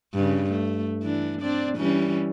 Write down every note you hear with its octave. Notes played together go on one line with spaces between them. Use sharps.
G2 C#3
A3
E3 D4
C4 D4 D5
E3 G3 C#4